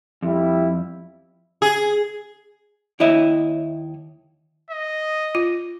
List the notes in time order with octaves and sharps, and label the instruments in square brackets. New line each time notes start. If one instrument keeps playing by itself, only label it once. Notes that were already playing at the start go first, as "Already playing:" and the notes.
[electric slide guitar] F2 [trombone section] G3 E4
[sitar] G#4
[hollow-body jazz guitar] D#2 E4 C#5 D#5 E5
[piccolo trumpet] D#5
[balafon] F4